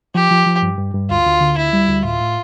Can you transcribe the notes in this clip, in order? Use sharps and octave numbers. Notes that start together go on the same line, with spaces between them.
F3 G4
F3
F3
G2
G2
G2
D2 F4
D2
D3
D2 E4
G3
D2
A2 F4
A2